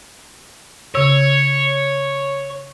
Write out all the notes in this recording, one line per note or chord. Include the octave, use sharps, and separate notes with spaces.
C#3 C#5 E6